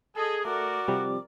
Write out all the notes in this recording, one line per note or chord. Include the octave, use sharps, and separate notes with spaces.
G#4 A4 D#5
A3 F#4 A#4 D5 D6
C3 F3 G3